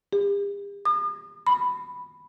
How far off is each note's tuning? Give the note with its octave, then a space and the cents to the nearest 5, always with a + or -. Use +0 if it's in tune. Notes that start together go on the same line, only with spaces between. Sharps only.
G4 +45
D#6 -45
B5 +0